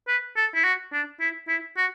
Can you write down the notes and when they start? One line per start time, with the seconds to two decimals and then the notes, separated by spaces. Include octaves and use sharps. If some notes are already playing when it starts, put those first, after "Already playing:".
0.08 B4
0.37 A4
0.55 E4
0.64 F#4
0.93 D4
1.20 E4
1.48 E4
1.77 F#4